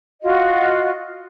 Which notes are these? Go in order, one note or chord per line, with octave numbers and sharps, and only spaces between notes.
F4 F#4 D#5